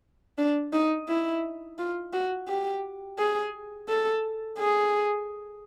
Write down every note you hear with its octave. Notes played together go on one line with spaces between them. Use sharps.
D4
D#4
E4
F4
F#4
G4
G#4
A4
G#4